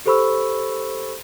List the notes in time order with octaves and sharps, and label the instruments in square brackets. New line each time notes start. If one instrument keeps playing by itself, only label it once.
[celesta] G4 A4 C5 B5 C#6 E6